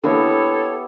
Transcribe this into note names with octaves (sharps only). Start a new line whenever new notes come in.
D3 A#3 B3 E4 G4 A4 C#5